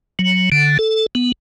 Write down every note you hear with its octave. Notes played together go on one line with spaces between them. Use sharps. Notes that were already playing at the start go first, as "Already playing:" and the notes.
F#3
D3
A4
B3